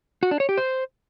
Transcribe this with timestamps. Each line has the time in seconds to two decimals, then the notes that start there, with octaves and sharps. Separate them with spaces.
0.23 F#4
0.31 D4
0.40 C#5
0.49 G4
0.57 C5